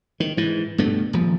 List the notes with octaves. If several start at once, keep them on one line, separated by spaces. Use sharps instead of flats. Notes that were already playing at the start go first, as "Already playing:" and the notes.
D#3
G#2 E3
G2 B2 A3
D#1 F3